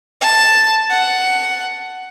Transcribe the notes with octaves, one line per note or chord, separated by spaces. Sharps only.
A5
F#5